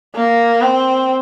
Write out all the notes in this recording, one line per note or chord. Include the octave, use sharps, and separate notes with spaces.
A#3
C4